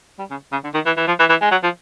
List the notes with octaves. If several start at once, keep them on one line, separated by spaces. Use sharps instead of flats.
G3
C#3
C#3
D3
D#3
E3
E3
F3
E3
E3
G#3
F#3
F3